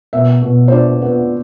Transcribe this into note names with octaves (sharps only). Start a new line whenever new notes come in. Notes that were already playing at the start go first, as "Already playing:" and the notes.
B2 E5
B2
C5
D4 D5
B3